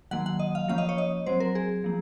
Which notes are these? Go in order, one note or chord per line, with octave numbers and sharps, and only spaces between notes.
D#3 F#3 A#3 F#5
F#5
D#5
F5
F3 A#3 C#4 F5
D#5
C#5
D#5
F#3 C4 C5
A#4
G#4
F3 A#3